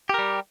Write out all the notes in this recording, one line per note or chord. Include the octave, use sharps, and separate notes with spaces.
G3 G4 A#4